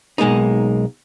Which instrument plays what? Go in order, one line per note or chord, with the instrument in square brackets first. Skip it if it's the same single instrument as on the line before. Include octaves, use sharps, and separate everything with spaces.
[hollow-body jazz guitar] B1 G#3 A#3 D#4